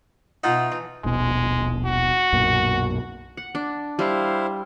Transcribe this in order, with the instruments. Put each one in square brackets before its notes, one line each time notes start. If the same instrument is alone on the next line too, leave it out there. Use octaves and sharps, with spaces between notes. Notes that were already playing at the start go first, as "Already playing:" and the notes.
[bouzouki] B2 E5 F#5 [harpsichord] D#4 F4
[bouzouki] E3
[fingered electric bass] D#1 A#1 B2 [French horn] G#3
[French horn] F#4
[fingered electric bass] B1 F#2 A#2
[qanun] F#5
D4
[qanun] G3 [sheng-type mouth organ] E4 C5 F5